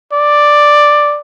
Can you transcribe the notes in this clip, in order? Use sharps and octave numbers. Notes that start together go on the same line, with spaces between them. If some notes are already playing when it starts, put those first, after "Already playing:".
D5